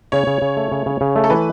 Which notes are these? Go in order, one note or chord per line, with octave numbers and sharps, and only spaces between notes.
C#3 C#5
C#3
C#3
A3
C#3
C#3
C#3
A3
A4
E3 B4